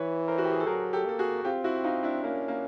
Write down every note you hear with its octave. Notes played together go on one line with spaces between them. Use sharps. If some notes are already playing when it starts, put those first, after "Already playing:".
Already playing: E3 B4 C#5
A#4 C5
F#4
G4
G#4
A4
F#3 G#4 A#4
G4 A4
A#3 A4
F#4 G#4
C4 F4 G4
E4 F#4
D#4 F4
D4 E4
A#3 C#4
A#3